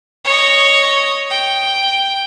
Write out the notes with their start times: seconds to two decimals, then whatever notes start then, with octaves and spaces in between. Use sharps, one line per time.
0.25 C#5 D#5
1.30 G5